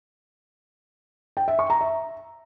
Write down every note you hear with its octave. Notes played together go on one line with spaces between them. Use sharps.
G5
E5
C#6
A#5
E5